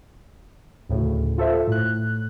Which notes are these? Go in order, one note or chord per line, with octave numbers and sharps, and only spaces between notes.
D2 A2 C#3
F4 A4 C5 E5
A2 F#6